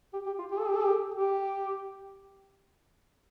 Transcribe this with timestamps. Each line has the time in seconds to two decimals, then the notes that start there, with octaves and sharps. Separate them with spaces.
0.13 G4
0.26 G4
0.39 F4
0.51 G4
0.59 A4
0.68 G4
0.76 A4
0.84 G4
1.15 G4